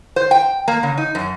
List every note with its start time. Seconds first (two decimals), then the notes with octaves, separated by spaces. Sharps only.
0.16 C5
0.31 G5
0.68 A#3
0.83 C#3
0.98 D#4
1.15 F#2